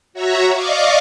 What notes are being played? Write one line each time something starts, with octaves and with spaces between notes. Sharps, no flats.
F#4 C#5 E5 A#5
D5 D#5 F5 C#6 D6